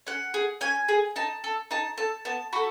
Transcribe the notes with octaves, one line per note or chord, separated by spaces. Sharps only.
C#4 F#5
G#4
C#4 G#5
G#4
D#4 A5
A4
D#4 A5
A4 A5
B3 A5
F#4 A4 B5